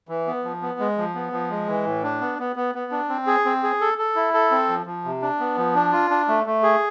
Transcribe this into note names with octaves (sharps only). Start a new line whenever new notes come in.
E3
B3
F3
B3
G#3
F3
B3
F3
G#3
E3
A2
D4
B3
B3
B3
B3
D4
C4
G#4
C4
G#4
A4
A4
E4
A4
C4
F3
F3
C3
D4
B3
F3
D4
F4
D4
A3
A3
G#4